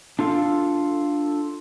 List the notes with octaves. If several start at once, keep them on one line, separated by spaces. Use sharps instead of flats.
D4 F4 A4 F5